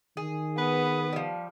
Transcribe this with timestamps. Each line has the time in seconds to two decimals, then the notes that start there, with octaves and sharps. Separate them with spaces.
0.17 D#3 G#4
0.58 B3 B4 D#6
1.13 F3 G3